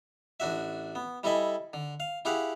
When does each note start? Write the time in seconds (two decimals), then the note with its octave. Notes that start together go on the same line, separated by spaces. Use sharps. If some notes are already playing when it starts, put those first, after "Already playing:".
0.40 A1 D4 F#4 E5
0.95 B3
1.24 G3 E4 A4 D#5 G#5 B5
1.73 D3
2.00 F5
2.25 E4 G4 G#4 F5 F#5